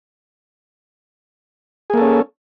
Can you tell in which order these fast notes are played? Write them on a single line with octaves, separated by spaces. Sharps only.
G#4 A#3 A4 C#4